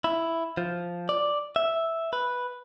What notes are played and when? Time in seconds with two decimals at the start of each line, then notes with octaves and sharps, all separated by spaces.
0.04 E4
0.57 F3
1.09 D5
1.56 E5
2.13 B4